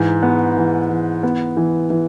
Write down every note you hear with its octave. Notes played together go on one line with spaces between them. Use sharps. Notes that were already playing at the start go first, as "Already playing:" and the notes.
Already playing: G#2 E3
B3
E3
E3
B3
E3
E3